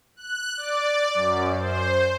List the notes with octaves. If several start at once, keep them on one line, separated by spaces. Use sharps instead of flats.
F#6
D5
F#2
C5